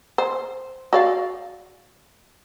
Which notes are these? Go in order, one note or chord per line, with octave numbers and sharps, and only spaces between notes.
C5
F#4 D5 F5